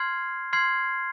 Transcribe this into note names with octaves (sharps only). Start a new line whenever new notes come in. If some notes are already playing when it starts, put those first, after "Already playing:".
Already playing: C6 F6 G#6 C7
C6 F6 G#6 C7